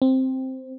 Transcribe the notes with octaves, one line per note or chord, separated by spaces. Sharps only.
C4